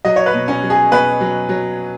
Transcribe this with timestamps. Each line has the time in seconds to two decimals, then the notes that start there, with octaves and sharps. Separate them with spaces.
0.05 F#3 D#5
0.16 C#5
0.26 B4
0.34 B2
0.48 C#4
0.63 F#3
0.70 G#4
0.91 B2 B4
1.21 F#3
1.49 F#3